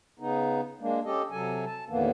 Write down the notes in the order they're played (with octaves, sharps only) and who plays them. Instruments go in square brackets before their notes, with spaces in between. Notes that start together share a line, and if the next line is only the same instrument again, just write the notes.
[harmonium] C#3 B3 D#4
G#3 A#3 D4
C#4 G4 A4 D#5
C3 F#3 A4 G#5
A5
D#2 A2 D3 E3 A#3 B3